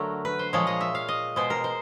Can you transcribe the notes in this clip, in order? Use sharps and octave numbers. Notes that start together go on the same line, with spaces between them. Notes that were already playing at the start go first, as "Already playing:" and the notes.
Already playing: D3 F#3 A3 A#4
B4
C5
A#2 F3 G#3 C#5
D#5
E5
F5
D#5
B2 G#3 C5
A#4
C5